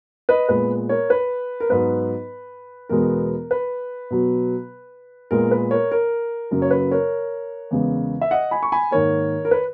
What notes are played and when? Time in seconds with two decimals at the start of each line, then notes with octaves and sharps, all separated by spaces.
0.29 B4 D#5
0.49 A#2 G#3 B3 B4
0.89 A#4 C#5
1.10 B4
1.60 A#4
1.69 G#2 F#3 B3 B4
2.89 E2 B2 G#3 B3 A#4
3.51 B4
4.10 B2 F#3 B3
5.31 A#2 G#3 B3 A#4
5.51 B4
5.71 A#4 C#5
5.92 A#4
6.51 F#2 C#3 F#3 A#3 A#4
6.62 C#5
6.71 B4
6.91 A#4 C#5
7.71 E2 C#3 G#3 B3
8.21 E5
8.31 D#5 F#5
8.51 G#5 B5
8.63 C#6
8.72 G#5 B5
8.91 G#2 D#3 A#3 A#4 C#5
9.45 A#4
9.51 B4